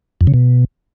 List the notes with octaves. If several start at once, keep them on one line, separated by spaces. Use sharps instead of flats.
F2
C#3
B2